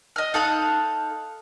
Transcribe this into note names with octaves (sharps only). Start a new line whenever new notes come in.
D#5 F6
D#4 A4 F5 F#6